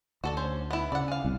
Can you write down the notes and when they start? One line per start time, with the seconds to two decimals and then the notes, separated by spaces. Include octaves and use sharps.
0.24 D2 F#4 A4 D5
0.37 C#4 C5
0.70 B3 E4
0.92 C#3 D5 F#5
1.08 G#4 F5
1.25 C2